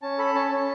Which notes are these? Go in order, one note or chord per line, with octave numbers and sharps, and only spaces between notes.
C#4 A5
A4 B5
C#4 A5
C#4 A5